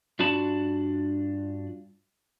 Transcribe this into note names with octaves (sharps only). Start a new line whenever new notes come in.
G2 D4 F4 F#4 A5 B5